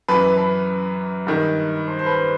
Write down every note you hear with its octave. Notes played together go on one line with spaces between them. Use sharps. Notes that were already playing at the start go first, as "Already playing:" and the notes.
F#2 E3 B4
B4
G2 D#3
C5
C5
B4